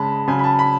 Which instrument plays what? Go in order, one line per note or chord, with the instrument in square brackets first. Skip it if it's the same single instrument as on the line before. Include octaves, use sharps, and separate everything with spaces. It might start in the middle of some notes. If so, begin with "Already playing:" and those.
Already playing: [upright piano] C#3 G#3 A5 B5
C#3 F#3 G#5
B5
A5
B5